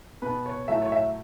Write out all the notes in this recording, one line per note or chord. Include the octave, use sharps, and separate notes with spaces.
B2 B3 B4
C#5
A2 F#3 A3 E5
C#5
E5